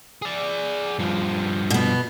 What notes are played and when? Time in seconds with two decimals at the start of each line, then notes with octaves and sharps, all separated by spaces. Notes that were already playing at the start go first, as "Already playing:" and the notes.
0.22 G#4 D5
0.99 G2 F3
1.70 B2 B3